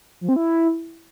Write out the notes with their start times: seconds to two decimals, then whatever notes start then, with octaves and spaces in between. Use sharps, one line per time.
0.21 F3
0.29 C4
0.36 E4